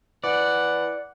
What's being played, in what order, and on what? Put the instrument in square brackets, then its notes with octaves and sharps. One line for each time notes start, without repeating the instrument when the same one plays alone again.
[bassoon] E3 [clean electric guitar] D5 [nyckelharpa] F#5